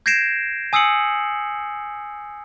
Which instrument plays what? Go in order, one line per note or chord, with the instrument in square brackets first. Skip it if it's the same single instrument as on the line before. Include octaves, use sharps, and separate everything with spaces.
[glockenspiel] G6 G#6 A#6 C7 D7 E7
G#5 D#6 E6 C7 C#7 F#7